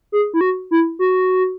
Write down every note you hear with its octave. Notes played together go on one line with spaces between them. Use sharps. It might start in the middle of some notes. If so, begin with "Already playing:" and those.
G#4
E4
F#4
E4
F#4